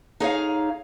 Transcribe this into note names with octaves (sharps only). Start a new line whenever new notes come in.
D#4 G#4 C#5 F5